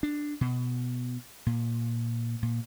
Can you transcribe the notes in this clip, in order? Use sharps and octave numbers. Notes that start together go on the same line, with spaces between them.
D4
B2
A#2
A#2